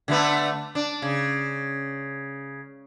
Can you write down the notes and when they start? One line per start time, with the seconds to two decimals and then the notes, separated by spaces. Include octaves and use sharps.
0.08 D3 A3 B3
0.75 D4
1.02 C#3